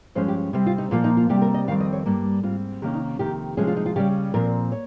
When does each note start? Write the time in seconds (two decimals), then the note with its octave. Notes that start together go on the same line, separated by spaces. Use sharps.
0.15 G2 F3 G#3 C#4 C5
0.28 G4
0.53 C3 G3 C4
0.67 F4
0.78 D#4
0.91 A#2 F3 A#3 F4
1.04 D#4
1.17 F4
1.29 C3 G3 C4 G4
1.42 A#4
1.54 D#5
1.67 F2 D#3 G3 C4 F5
1.80 D#5
1.93 C#5
2.06 G2 G3 A#3
2.43 G#2 G3 C4 F4
2.82 C3 D#3 A#3 C#4 G4
2.94 D#4
3.19 F2 C3 D#3 G4
3.57 C3 F3 G#3 C#4 G#4
3.67 F4
3.77 D#4
3.86 F4
3.96 C#3 G3 C#4 G4
4.34 A#2 F3 C4 A#4
4.72 C#5